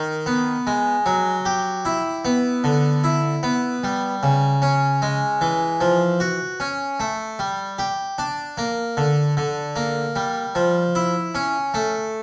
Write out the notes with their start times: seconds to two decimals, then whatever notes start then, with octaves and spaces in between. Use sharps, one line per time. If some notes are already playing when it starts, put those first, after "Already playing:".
Already playing: D#3
0.26 B3
0.67 G#3
1.06 F#3
1.45 G4
1.85 E4
2.25 B3
2.64 D3
3.04 E4
3.43 B3
3.83 G3
4.23 C#3
4.62 C#4
5.02 G#3
5.41 E3
5.81 F3
6.20 F#4
6.60 C#4
7.00 A3
7.39 G3
7.79 G4
8.18 D4
8.58 A#3
8.97 D3
9.37 D3
9.76 A#3
10.16 G3
10.55 F3
10.95 E4
11.35 C#4
11.74 A3